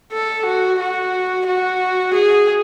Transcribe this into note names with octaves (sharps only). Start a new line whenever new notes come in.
A4
F#4
F#4
F#4
G#4